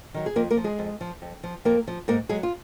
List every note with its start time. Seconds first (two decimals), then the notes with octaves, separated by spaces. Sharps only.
0.14 D#3 F#3
0.26 G#4
0.36 F2 A#3 A#4
0.50 A#3 A#4
0.57 F3
0.64 G#3 G#4
0.79 F2
1.01 F3
1.22 F2
1.43 F3
1.65 F2 A#3 A#4
1.87 F3
2.08 G#2 A#3 A#4
2.29 F#3 G#3 G#4
2.43 F4